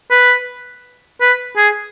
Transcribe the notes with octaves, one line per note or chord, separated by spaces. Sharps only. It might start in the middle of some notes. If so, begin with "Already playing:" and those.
B4
B4
G#4